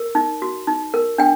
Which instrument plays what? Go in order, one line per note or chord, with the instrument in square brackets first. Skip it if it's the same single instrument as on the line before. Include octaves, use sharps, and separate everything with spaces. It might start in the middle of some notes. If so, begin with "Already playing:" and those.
Already playing: [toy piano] A#4
D#4
F#4
D#4
A#4
D4 G5